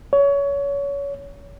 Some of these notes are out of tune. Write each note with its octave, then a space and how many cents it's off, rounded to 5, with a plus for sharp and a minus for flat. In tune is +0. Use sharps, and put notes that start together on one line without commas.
C#5 +25